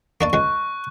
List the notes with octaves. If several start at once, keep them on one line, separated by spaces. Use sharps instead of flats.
A#3 D4 D5 C#6
C#2 G#3 C#6 F#6